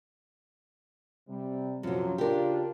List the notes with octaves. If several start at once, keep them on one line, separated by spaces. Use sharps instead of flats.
C3 G3
F#2 C3 F3 F#3
C#3 D4 F4 G4 A#4